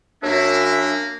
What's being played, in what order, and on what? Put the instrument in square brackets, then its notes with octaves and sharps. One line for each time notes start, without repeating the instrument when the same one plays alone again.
[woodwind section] F#2 D4 E5 [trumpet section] A#3